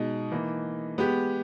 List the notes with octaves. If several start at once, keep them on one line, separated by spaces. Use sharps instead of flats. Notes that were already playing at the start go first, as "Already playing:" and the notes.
Already playing: B2 G#3 D#4
E3 A#3 D#4
G#3 B3 G4